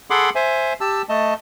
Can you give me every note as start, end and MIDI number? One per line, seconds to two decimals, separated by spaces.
0.10 0.30 68
0.10 0.30 69
0.10 0.30 78
0.10 0.30 83
0.10 0.30 84
0.10 0.30 86
0.35 0.73 72
0.35 0.73 76
0.35 0.73 80
0.81 1.02 67
0.81 1.02 81
0.81 1.02 88
1.09 1.34 57
1.09 1.34 75
1.09 1.34 81